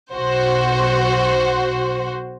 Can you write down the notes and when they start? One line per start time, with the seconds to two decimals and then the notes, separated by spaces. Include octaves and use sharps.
0.14 B1 F#4 C5